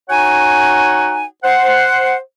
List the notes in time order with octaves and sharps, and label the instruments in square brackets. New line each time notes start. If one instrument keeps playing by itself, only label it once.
[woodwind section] D#4 F#4 C#5 F#5 G#5
C5 F#5